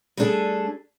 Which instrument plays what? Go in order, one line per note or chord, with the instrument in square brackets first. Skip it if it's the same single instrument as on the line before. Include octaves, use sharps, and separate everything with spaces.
[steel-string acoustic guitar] G3 A3 B3 D4 G#4 A4